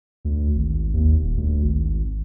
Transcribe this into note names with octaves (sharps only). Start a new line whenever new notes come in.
D2
G#1
D#2
D#1
D2
G#1